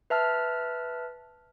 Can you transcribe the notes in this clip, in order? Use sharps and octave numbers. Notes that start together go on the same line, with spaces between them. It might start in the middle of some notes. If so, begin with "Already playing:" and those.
B4 E5 A5 F6